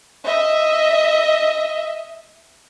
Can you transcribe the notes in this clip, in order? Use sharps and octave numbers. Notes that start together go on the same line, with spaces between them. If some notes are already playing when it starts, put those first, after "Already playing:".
D#5 E5